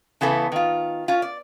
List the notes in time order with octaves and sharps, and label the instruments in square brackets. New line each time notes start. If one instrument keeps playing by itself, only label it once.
[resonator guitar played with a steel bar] C#3 E3 B3 A4
D#3 F4
C#4 F4
D5